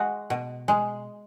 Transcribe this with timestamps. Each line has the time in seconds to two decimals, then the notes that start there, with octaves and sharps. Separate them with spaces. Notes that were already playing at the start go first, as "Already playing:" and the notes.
Already playing: G#3 F#4
0.30 B2
0.68 G#3